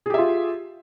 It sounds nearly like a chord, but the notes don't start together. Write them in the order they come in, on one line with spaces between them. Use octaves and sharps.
G#4 G4 E5 F4